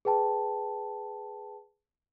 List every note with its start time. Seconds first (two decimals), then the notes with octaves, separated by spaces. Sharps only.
0.05 G#4 B4 G5 A5